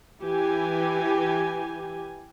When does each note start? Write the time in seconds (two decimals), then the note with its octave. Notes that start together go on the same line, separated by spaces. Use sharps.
0.23 E3 G4 G#5